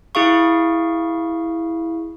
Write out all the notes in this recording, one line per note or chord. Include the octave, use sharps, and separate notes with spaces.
E4 G#4 F5 C#6